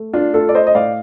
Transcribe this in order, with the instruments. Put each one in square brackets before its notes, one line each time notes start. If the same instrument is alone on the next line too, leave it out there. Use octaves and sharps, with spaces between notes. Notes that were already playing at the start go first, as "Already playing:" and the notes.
Already playing: [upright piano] A3
D4 F4
A3 F4 A4
D5
C5 D#5
D#5
A2 D5 F5